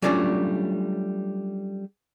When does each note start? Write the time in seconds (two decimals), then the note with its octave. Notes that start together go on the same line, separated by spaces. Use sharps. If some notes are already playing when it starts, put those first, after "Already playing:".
0.02 F#3 G3 A3 C#4 D4 F4